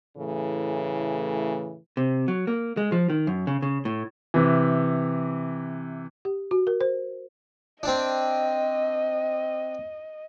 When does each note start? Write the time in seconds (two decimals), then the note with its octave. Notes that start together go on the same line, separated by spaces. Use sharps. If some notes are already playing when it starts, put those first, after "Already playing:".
0.17 A2 C#3 E3 A3
1.97 C3
2.28 F#3
2.47 A#3
2.77 G#3
2.92 F3
3.10 D#3
3.27 F#2
3.47 C#3
3.62 C#3
3.85 A2
4.34 C3 E3
6.25 G4
6.51 F#4
6.67 A#4
6.81 C5
7.83 C4 D4 D#5